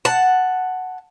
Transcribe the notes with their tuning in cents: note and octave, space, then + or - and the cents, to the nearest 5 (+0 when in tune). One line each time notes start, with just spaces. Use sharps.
F#5 +0 A5 +0